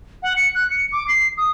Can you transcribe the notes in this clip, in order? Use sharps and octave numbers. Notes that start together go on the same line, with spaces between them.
F#5
C#7
F#6
C#7
D6
C7
D#6